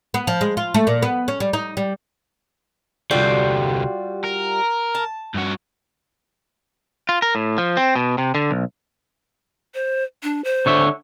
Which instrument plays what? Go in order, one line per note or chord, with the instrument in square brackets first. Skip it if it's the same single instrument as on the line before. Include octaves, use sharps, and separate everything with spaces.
[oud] B3
F3
G#3
F4
A3
A#2
B3
C#4
G3
D#4
G3
[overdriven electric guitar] C2 D3 [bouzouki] G3 F4 F#4
[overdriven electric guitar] A#4
[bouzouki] A5
[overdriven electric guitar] G2 F#4
[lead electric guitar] F4
A#4
A2
F3
C4
B2
C3
D3
B1
[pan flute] C5
D4
C5
[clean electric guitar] D3 C#5 E5